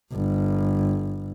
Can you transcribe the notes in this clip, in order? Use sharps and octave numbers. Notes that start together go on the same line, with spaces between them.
G1